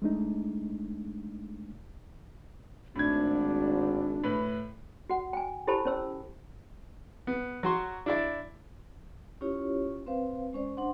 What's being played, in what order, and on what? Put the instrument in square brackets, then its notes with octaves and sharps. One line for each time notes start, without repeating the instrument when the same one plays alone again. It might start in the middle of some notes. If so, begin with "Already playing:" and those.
[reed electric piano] G#3 A3 D4 D#4
[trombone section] G#1 [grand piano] A2 G#6 [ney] D4
[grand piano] A2 B4
[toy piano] F#4 F#5
G5 G#5
E4 G4 A4 C5 A5 B5
C#4 C5 E6
[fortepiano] B3
F#3 F#4 C6
D4 E4 D5
[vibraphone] C#4 E4 F4 G4 C#5
C4 B4 C5 F5
G#3 C#4 C5 D5
D4 C5 F#5 C6